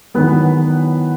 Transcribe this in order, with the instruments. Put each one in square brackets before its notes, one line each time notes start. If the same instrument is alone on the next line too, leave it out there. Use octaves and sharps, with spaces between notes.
[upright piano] E2 D#3 F#3 B3 B4